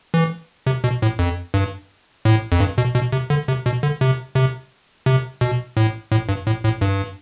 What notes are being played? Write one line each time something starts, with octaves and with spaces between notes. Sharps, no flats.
E3
C3
B2
A2
F2
G2
A2
F2
G2
B2
B2
C3
D3
C3
B2
D3
C3
C3
C3
B2
A2
A2
G2
A2
A2
G2